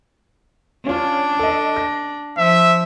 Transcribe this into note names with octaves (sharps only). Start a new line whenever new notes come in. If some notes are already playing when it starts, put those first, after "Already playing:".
C#4 D4 F4
A4 D#5
A#6
F3 E5